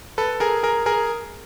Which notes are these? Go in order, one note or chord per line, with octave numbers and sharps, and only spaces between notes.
A4 B4
G#4 A#4
G#4 A#4
G#4 A#4